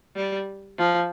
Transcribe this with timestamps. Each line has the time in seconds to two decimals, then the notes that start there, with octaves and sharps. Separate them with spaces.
0.16 G3
0.78 F3